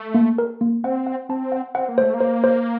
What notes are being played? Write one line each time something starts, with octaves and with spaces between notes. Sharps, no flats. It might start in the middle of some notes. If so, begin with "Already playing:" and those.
Already playing: A3
A#3
A#4
A#3
C4 F#5
F#5
C4 A5
F#5
C4 F#5
A#3
A3 C5
A#3
C5
C5